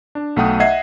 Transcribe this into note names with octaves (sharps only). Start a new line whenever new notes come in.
D4
B1 A3 F#5 G5 D#6
D#5 E5 F#5 G#6 C7